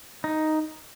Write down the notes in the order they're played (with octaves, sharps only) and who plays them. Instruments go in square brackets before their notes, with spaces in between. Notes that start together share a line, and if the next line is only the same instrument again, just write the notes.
[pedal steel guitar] D#4